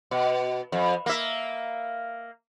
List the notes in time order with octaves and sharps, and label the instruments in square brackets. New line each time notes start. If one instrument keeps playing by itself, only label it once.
[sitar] B2
F2
A#3 E5